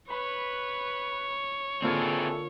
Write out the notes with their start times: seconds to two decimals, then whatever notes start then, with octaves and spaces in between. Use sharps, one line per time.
0.10 B4 C#5 B5
1.82 D3 A#3 C4 D4 E4 F4 G#4 A4